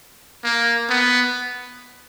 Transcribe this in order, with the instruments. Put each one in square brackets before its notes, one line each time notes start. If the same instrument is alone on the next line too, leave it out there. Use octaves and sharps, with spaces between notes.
[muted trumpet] A#3
B3